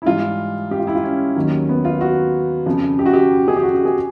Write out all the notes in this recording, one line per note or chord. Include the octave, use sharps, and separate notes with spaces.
E4
G#2 E3 G3 F4
G4
F4
E4
F4
C#4
D#2 D#3 F#3
B3
F4
F#4
F2 C#3 F3
G4
F#4
G4
G#4
G4
F#4
G4
G#4